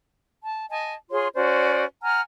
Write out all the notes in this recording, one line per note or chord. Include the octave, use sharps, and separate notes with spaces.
A5
D#5 G#5 A5
F4 G#4 C#5 C6
C#4 F#4 C5 D5
F#5 G#5 A#5 F6